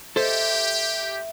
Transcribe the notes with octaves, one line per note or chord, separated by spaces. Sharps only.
G4 A4 C5 E5